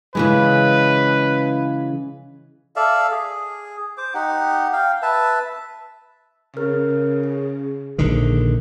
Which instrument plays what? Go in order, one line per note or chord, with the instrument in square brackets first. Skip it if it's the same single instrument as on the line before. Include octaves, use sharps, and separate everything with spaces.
[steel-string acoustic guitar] C#3 E3 G#3 [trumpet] B4
[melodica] A4 D5 E5 F5
G#4
C5 D6
D#4 G4 F#5
F5 G5
B4 E5 A5
[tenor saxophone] C#3 [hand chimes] A#4 F6
[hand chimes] G#4
[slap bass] A#1 D3 D#3